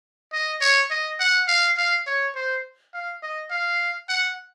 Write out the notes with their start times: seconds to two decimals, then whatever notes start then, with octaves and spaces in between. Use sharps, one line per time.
0.33 D#5
0.61 C#5
0.91 D#5
1.20 F#5
1.48 F5
1.77 F5
2.07 C#5
2.35 C5
2.94 F5
3.22 D#5
3.51 F5
4.09 F#5